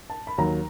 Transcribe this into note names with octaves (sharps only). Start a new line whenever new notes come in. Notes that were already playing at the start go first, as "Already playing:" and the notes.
A5
B5
D#2 D#3 F#3 A#5